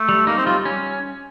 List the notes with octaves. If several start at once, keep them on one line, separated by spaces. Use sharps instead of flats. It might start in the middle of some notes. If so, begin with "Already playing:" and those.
Already playing: A3
G3
A#3 D#4
C4
G3 F4
C#4